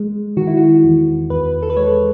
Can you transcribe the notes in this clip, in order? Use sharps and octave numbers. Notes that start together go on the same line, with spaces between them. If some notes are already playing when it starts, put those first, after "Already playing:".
Already playing: G#3
D#3 F#4
E4
F#4
E2
E2 B4
A4
B4
G#3 C#5